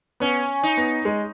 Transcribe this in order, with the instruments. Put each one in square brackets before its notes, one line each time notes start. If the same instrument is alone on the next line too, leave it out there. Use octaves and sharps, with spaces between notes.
[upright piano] B3 [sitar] C#4
[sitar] D#4
[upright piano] B3
G#3